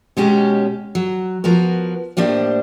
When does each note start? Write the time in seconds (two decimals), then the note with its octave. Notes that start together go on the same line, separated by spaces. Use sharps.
0.17 B2 G#3 C#4 G4
0.95 F#3
1.44 F3 B3 F#4 A#4
2.17 A2 G3 A#3 D4 C5